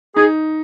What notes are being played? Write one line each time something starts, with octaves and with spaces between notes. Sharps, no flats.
D#4 G#4